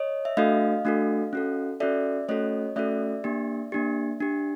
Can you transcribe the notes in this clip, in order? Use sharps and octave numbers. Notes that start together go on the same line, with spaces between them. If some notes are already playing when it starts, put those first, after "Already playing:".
Already playing: C#5 D#5
E5
A3 D4 F#4 A4 D#5 F5
A3 D4 F#4 A4
C#4 F#4 A4
C#4 F#4 A4 D5 E5
A3 C#4 F#4 A4 C#5 D#5
A3 C#4 F#4 A4 D5 E5
A#3 D4 G4
A#3 D4 G4
D4 G4